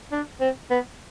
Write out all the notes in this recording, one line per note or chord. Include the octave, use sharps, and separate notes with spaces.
D4
C4
B3